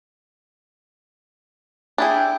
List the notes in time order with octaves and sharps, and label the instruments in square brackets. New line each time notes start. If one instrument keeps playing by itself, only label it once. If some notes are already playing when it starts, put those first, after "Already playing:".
[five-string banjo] D4 E4 G#4 [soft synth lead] G5